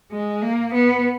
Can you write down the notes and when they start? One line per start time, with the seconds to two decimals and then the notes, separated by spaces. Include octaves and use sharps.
0.12 G#3
0.42 A#3
0.74 B3